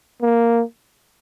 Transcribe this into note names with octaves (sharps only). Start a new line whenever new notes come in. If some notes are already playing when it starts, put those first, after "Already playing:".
A#3